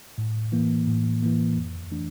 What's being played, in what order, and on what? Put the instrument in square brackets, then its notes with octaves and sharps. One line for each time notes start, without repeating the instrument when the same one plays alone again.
[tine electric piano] A2
E3 A#3
A2
E3 A#3
F2
E3 A3 D4